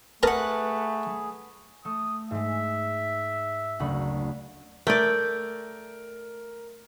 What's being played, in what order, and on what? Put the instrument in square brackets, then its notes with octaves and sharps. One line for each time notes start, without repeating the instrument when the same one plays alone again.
[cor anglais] A3 [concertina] G#4 [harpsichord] A#4 A5 A#5 [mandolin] B4 F#5
[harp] A3 [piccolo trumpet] D#6
[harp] G#2 G#3 [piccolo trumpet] E5
[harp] F#1 D2 B5
[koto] A3 [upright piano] A#4 [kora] D5 G5